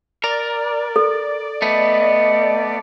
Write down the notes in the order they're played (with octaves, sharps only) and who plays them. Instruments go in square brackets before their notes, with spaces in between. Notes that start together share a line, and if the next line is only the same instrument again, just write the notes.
[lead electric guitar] A#4 [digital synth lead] D5
[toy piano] A4
[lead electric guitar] A3 B3 [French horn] D#5